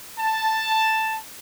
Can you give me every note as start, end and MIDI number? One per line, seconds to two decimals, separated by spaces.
0.18 1.17 81